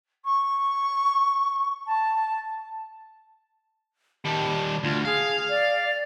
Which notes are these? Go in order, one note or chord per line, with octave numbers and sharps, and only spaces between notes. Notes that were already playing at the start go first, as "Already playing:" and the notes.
C#6
A5
D#3 G3 A5
D2 F4
G#4 F5
D5